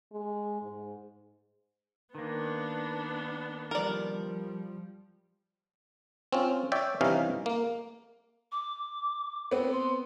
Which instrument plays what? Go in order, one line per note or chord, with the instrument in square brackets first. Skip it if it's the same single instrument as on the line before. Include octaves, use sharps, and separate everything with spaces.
[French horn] G#3
G#2
[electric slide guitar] D#3 A#3 [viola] B3 D4
[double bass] F3 G3 [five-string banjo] A#4 D5
[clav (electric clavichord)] C4 C#4 F4
C#5 D5 E5 G5
G2 C3 E3 C#4 D#4 F5
A#3
[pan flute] D6
[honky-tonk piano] B3 C4
[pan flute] C6